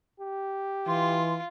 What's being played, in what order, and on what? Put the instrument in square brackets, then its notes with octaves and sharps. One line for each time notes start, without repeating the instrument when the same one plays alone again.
[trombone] G4
[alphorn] E3 [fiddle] F4 [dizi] C6